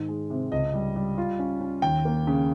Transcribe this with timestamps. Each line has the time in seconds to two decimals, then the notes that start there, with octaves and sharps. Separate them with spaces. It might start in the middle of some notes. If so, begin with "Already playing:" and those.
Already playing: G#2 D#3
0.09 G#3
0.30 C3
0.52 C#2 D#5
0.74 G3
0.96 G3
1.18 F4
1.39 C#4
1.61 C#4
1.82 D#2 G5
2.05 A#3
2.27 C#3